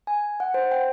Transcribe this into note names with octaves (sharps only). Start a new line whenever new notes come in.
G#5
F#5
C5
G5